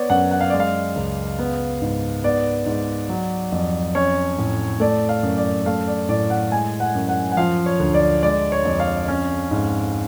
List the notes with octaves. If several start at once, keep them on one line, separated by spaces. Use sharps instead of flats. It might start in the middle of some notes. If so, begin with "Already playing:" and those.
Already playing: B3 C#5 D5
F#2 F#5
F#5
F5
G#3 D5
F5
C#2
B3
G#2
B3 D5
G#2
F#3
F2
C#4 C#5
A2
A3 D5
F5
F#2
D5
A3 F5
D5
A2 D5
F#5
G#3 G#5
F#5
F#2
F#5
F#5
F3 F5
C#5
D2
D5
G#3 D5
C#5
F2
F5
C#4
G#2